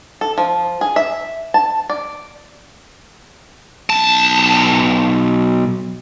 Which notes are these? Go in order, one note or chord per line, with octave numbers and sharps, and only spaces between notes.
A4
F3
G#4
E5
A5
D5
B1 A5